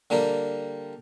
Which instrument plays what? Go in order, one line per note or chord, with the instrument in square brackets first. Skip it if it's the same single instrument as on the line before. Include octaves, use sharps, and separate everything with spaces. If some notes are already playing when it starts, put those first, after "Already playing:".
[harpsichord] D3 G3 A#3 G4 A#4